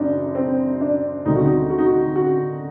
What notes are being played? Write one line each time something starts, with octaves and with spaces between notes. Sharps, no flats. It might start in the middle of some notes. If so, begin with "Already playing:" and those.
Already playing: F#1 F#2 D4 D#4
C4
D4
D2 C3 D#3 G3 D#4
F#4
D#4
F#4
D#4
F#4
F#4